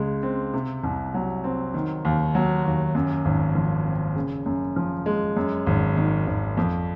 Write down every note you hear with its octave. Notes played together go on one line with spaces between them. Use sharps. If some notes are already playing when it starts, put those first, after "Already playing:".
Already playing: C#2 C#3 G#3
C4
C3
C2
F#3
C4
D#3
D#2
F#3
D#2
F#2
G#1
F3
C4
C#3
F#2
F3
G#3
F#2
G#1
D#3
G#1
F2